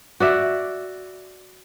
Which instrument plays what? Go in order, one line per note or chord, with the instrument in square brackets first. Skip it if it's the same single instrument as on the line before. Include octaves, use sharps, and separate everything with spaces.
[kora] F#4 D5 E5